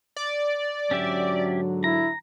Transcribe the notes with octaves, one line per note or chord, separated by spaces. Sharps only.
D5
G#2 D3 F#3 C#4 G4 E5
E4 A#5